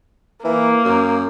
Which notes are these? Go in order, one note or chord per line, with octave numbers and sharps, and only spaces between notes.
E3 A#3
F#2